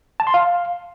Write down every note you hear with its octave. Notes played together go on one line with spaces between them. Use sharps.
A5
C6
F5